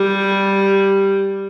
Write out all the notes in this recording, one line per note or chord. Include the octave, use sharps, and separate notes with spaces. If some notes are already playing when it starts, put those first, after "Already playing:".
Already playing: G3